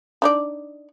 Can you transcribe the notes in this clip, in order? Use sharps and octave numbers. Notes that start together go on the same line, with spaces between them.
D4 D#4 D5